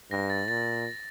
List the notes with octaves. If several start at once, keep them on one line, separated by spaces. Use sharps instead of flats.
G2 A#6
A6
A#2 A6